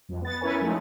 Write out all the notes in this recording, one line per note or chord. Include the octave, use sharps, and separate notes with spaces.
F2
B3 A6
C#4 E4 A#4 B4 C#5 G#5
F3 G#3 A3 D#4